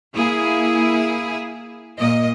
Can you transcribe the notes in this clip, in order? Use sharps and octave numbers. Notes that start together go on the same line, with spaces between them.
A#3 E4 G#4
A#2 A#3 D#5